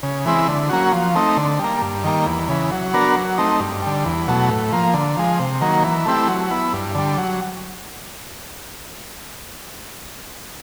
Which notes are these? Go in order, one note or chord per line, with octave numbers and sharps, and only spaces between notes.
C#3
E3 G#3 C4 E4
D3
F#3 A#3 C#4 F#4
F3
A3 C4 D#4
D3
G3 A#3
G2
D#3 G3 A#3
E2
C#3 E3
F#3
B3 D4 F#4 A#4
F#3
A3 C4 D#4
G2
D3 G3
E2
B2 F#3 A3
A2
F3 A#3
D3
F3 G#3
C3
D#3 F#3 A#3
E3
A3 C4 E4 G4
F#3
B3 E4
G2
D3 G3
F#3